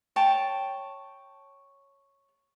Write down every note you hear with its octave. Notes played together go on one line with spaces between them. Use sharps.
C#5 G5 A5